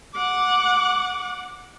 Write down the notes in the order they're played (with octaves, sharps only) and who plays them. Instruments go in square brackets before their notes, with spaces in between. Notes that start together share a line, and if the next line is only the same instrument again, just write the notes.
[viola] F#5 D6